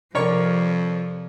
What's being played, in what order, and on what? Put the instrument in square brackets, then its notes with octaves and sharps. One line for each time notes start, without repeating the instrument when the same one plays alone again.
[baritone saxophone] F2 [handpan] C3 D5 [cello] F3 [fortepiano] A#4 C#5 C#6